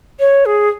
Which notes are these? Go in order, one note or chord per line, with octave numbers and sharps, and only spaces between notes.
C#5
G#4